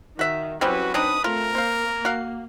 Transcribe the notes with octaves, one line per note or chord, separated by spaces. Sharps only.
D#3 F#4 E5
E3 F#3 G3 C4 C#4 F#4 B4
C4 D4 D#4 B4 D#6
A3 C4 F4 A#4
A#3 C5 F5
F#4 F5